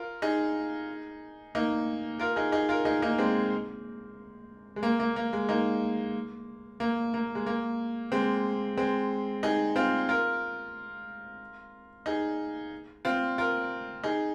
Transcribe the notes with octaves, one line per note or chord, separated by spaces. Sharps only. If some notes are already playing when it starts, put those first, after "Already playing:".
Already playing: F4 A#4
D#4 G#4
A#3 D#4
F4 A#4
D#4 G#4
D#4 G#4
F4 A#4
D#4 G#4
A#3 D#4
G#3 C4
G#3
A#3
A#3
A#3
G#3
A#3 D#4
A#3
A#3
G#3
A#3
G#3 C4
G#3 C4
D#4 G#4
C4 F4
F4 A#4
D#4 G#4
C4 F4
F4 A#4
D#4 G#4